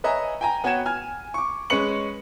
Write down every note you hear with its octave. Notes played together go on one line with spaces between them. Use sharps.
B4 C#5 D#5 E5 G#5 A#5
G5 G#5 A#5
B3 F#4 C#5 G5 G#6 E7
G#5 F6 G#6
C#6 D6
G#3 C#4 B4 C#6 C#7 F#7